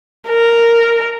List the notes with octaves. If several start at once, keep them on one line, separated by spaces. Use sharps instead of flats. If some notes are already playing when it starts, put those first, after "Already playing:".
A#4